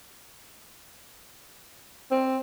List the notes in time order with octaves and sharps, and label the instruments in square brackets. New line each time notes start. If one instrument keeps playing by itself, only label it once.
[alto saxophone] C4